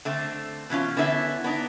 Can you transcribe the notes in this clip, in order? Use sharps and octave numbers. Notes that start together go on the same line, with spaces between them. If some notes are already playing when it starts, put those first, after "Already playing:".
D3 A3 C4
B2 E3 C#4 F4
D3 B3 C#4 E4 A4 E5
B3 D4 D#4